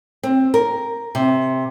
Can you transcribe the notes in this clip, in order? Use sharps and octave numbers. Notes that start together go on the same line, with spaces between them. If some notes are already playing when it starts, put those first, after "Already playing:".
C4
A#4
C3